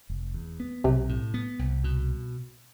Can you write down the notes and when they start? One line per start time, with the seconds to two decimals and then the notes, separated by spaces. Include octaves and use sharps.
0.10 F1
0.34 E2
0.60 B3
0.84 B1 C3
1.09 A2
1.34 B3
1.59 C2
1.84 B2